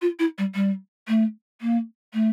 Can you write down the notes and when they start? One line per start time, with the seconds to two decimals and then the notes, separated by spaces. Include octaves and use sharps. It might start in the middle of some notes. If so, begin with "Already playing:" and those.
0.02 F4
0.19 E4
0.38 G3
0.55 G3
1.08 A3
1.61 A#3
2.14 A3